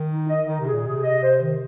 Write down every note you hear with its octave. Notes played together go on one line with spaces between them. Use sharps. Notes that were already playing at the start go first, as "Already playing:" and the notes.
Already playing: D#3
D#4
D#5
D#3 D#4
C3
G#4
A#2
C3 G#4
D#5
C5
D#3